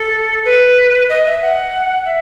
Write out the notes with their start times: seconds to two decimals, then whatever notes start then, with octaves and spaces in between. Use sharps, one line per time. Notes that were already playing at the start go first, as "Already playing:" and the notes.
Already playing: A4
0.45 B4
1.09 D#5
1.25 E5
1.41 F#5
2.05 E5